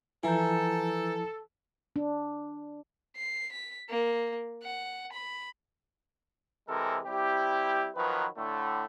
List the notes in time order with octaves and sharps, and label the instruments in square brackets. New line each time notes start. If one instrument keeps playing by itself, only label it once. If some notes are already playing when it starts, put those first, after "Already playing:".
[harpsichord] E3 [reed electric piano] F3 E4 [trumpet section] A4 [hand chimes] G#5 A#5 G6
[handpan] D4
[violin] C7
B6
A#3
F#5
B5
[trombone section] C3 E3 G#3 C4 A4 A#4
G3 C4 E4 G4
D#3 F3 F#3 B4
A2 D3 A3